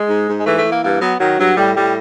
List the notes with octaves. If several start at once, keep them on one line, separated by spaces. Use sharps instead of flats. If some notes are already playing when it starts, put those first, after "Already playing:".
Already playing: G#3
G#2
G#2
G#3
E3 A3
A3
E3
A#3
G2 A#3
F#3 B3
D#3 F#3
G2 F#3
A2 G3
A2 G3